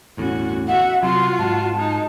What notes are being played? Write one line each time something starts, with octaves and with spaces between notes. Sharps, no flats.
G1 E2 A2 C#4 F#4
F#4 E5 F#5
C3 F#3 F4 F#4 C6
G#2 A5
G#3 D#4